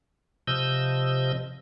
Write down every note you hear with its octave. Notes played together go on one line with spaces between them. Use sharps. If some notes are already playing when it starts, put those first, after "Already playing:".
C3 F3 D#5 E6 G6